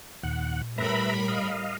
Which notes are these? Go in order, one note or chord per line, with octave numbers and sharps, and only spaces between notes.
D#2 A#2 F#5
A2 G3 A#4 B4 E5 A#5 B5
D#5 F5